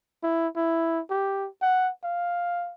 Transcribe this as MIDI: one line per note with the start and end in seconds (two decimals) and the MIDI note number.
0.23 0.47 64
0.56 1.00 64
1.10 1.48 67
1.62 1.90 78
2.04 2.74 77